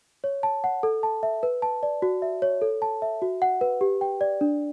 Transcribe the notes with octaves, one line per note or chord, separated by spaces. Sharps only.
C#5
A5
F#5
A4
A5
E5
B4
A5
D5
F#4
E5
C#5
A4
A5
E5
F#4
F#5
B4
G4
G5
D5
D4